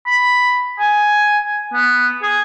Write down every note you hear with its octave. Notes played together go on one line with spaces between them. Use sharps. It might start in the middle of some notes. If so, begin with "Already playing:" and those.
B5
G#5
B3
G#4